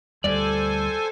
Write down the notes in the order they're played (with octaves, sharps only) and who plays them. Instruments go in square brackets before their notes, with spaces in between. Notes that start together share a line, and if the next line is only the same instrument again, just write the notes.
[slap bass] D2 G3 [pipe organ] A4 C5 G#5 [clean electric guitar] D5